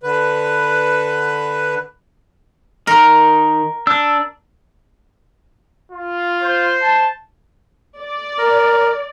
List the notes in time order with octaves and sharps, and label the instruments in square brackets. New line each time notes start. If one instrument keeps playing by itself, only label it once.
[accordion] D3 B4
[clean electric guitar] D#3 [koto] A#4
[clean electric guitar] D4 [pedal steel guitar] E6
[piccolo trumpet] F4
[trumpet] C5
[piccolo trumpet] A5
[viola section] D5
[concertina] A#4